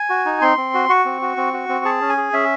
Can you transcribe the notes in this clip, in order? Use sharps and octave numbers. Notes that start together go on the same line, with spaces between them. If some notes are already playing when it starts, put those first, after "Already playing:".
Already playing: G#5
F#4
D#4
C4 C6
C4
F#4
F#4 C#6
C4
F#4
C4
F#4
C4
G#4 A5
C#4
G#5
G#4
C#4 E5